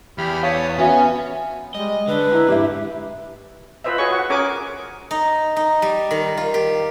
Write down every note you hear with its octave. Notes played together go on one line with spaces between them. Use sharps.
E2 G4 B5 F6
C#5 F5 A5 D#6
B3 C#4 F#4 E5 G#5
G3 G#3 D#5
D3 D4 B4
E4 A#5
E2 G#2 D4 E4 G4 E5
F4 B4 C5 D#5 E5
F#4 G#4 C#5 G#5 C#6
F#4 F#5
C#4 G#4 A#4 C#5 G#5 D6
D#4
D#4
G3
D#3
F4
G4